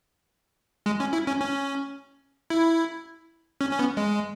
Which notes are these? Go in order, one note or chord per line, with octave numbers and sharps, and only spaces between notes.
G#3
C#4
E4
C#4
C#4
E4
C#4
C#4
B3
G#3